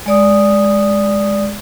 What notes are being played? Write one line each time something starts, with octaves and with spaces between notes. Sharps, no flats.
G#3 D5 D#6